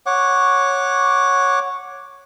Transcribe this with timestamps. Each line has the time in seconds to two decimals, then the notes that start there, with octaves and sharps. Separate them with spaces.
0.06 C#5 F#5 D6